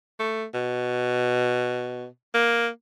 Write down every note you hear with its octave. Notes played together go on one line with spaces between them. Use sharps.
A3
B2
A#3